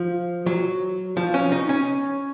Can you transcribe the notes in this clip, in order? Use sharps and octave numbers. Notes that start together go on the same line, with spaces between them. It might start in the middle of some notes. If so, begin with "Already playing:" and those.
Already playing: F3
F#3
F3
C#4
D#4
C#4